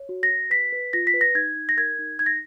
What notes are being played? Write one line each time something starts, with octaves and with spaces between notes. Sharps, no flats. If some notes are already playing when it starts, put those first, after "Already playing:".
Already playing: C#5
F#4
A#6
F#4
B4 B6
B4
F4 A#6
B6
B4
A#6
D#4 G#6
D#4
A#6
A#4 G#6
D#4
D#4 G#6
A#6